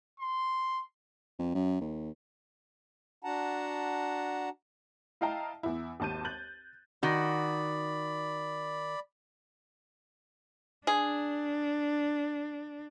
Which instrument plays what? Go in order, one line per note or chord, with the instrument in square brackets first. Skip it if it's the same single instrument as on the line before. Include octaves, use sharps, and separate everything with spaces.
[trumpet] C6
[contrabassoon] F2
F#2
D#2
[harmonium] D4 F#4 F#5 A5 A#5
[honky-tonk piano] E4 D#5 F5 G5 A5 A#5
E2 E4
G#1 D#2 A5 G6 D#7
F#6 G6 A6 F#7
[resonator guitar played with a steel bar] D#3 F#4 [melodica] D5 B5
[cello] D4 [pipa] G#4